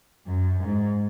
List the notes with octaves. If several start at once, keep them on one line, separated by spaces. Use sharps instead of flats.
F#2
G#2